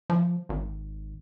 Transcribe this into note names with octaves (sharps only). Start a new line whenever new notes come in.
F3
G#1